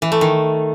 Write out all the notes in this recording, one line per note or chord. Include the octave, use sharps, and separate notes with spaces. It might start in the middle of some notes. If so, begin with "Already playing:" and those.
E3
A3
D#3